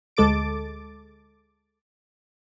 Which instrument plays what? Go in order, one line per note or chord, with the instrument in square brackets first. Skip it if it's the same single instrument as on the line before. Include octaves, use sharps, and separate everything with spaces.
[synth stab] D2 G#3 A4 D6 A6 D7